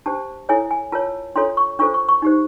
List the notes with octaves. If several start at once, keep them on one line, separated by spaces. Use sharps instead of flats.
D4 G4 C5 A5
E4 A4 C#5 G#5
G#5
F4 A#4 C#5 A5
D4 F4 A4 C#5 C6
C#6
D4 F4 A4 C5 C#6
C#6
C#6
D#4 G4 C5